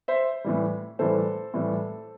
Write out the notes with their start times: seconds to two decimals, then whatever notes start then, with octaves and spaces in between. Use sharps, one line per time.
0.08 C5 E5
0.44 A2 E3 G3
0.99 A2 E3 G3 A4 C5
1.54 A2 E3 G3